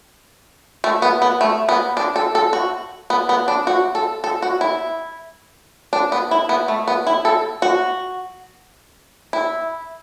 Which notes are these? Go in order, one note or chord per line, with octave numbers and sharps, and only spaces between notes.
A3
B3
B3
A3
B3
D4
A4
A4
F#4
B3
B3
D4
F#4
A4
A4
F#4
E4
D4
B3
E4
B3
A3
B3
E4
A4
F#4
E4